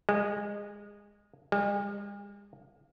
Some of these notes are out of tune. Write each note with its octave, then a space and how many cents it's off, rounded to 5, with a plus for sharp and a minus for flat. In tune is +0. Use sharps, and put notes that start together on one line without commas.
G#3 -20
G#3 -45